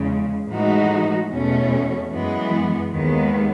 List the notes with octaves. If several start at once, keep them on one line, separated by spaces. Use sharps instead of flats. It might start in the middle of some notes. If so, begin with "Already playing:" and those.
Already playing: E2 C#3 G#3
A2 E3 G#3 D#4 F#4
E2 B2 A3 C#4
F#2 E3 G#3 B3
D#2 D#3 G#3 B3